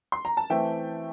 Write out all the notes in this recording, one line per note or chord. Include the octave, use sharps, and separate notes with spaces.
C6
A#5
A5
E3 A3 C4 E5 G5